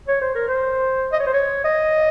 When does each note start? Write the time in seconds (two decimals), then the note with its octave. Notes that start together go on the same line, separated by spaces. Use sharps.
0.08 C#5
0.22 C5
0.35 A#4
0.48 C5
1.12 D#5
1.20 C#5
1.27 C5
1.34 C#5
1.64 D#5